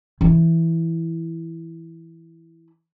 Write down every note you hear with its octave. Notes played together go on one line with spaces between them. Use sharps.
E3 E4